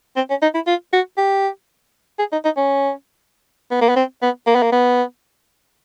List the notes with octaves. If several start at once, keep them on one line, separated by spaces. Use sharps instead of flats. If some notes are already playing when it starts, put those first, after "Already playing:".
C4
C#4
D#4
E4
F4
F#4
G4
G#4
D#4
D#4
C#4
B3
A#3
B3
C4
B3
A#3
B3
A#3
B3